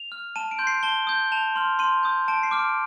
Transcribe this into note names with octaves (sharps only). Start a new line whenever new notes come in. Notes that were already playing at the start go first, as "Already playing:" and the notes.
Already playing: F7
F6
A5 D#7
D7
C6 G6
C7
A5 G7
D#6 G6
A5 F7
C6 F6
C6 D#7
D#6 G6
A5 D7
C7
D6 F6
D7